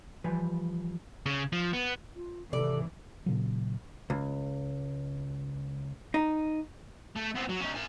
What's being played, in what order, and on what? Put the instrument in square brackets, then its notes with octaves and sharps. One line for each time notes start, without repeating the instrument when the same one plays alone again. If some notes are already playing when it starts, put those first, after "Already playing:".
[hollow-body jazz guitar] E3 F3 G3 B4 G#5
[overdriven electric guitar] C#3
F3
B3
[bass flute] F4
[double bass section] G#1 E3 [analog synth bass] C3 [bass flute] A4 [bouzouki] D5
[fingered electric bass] A#2 C#3 F#3
[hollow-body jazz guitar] C#2
D#4
[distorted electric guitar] A3
B3 C4
F#3
C#4 D#4
A#4 G#5